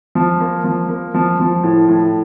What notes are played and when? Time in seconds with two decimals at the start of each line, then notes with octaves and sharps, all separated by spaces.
0.15 F3
0.40 A#3
0.64 F3
0.89 A#3
1.14 F3
1.40 F3
1.64 A2
1.89 A2